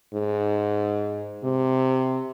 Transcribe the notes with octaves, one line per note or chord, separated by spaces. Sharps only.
G#2
C3